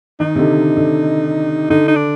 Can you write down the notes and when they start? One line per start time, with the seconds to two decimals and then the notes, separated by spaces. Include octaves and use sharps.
0.20 D#3 D#4
0.35 C3
0.39 D3
0.77 D3
1.70 D3 D#4
1.88 D#4
1.95 D4